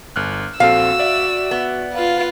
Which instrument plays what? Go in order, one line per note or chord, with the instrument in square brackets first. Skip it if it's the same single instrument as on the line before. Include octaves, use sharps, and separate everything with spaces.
[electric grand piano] G1 F6 F#6
[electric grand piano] A#1 C4 A4 [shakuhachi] F#4 [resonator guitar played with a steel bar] F5 [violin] E6
[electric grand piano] D5 E5
[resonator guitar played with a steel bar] B3
[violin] F4 B4 [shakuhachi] F5